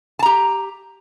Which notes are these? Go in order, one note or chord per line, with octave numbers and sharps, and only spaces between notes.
G4 A5 A#5